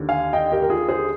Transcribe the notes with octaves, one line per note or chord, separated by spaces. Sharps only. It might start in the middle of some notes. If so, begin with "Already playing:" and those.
Already playing: D#2 D3
F5 G#5
D#5 G5
G4 A#4
A#4
F4 G#4
G#4 C5